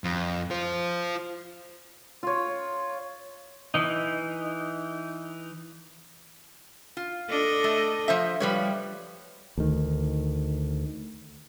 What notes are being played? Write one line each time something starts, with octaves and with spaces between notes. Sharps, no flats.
F2
F4 C5
F4 C#5
E3 D#4
F4
D4 A4 D#5
A3
F3 C5 E5
F3 G3 B4 C#5
D2 D#3